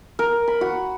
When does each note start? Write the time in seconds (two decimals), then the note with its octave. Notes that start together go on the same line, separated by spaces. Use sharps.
0.19 A#4
0.48 B5
0.61 F#4